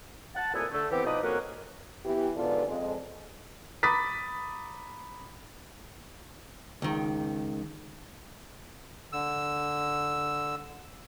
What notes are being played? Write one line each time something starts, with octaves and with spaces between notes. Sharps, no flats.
F#5 A5
C2 F2 A#2 B3 E5 G#5
D3 A3
E3 B3 C4 G4
B2 F3 D#4 B4 D5 D#6
F2 F#3 A#3 C#4 F#5
E3 B3 G4
G#2 D3 B3 F4 A4 D5
F2 G#3
A#5 B5 D6 D#6 A6 B6
C#2 D#3
D3 E6